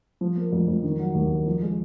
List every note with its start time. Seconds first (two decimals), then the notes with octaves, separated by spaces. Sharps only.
0.21 F3
0.37 A#3
0.52 F2
0.68 F2
0.84 D#3
0.99 F#3
1.15 D#2
1.31 A#3
1.46 F3
1.62 G#3